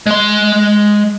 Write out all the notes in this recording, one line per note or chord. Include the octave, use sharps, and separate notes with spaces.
G#3 C6